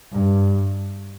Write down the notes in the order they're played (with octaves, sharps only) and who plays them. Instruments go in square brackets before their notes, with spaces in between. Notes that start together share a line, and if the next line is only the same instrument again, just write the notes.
[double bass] G2